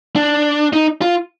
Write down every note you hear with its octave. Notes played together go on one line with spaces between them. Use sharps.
D4
D#4
F4